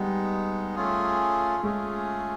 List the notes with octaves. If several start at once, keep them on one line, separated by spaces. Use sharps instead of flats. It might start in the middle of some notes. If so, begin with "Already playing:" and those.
Already playing: G3 G#3 B3 D#4
A3 C#4 F4 G#4
G#3 A3 C#4 F4 G#4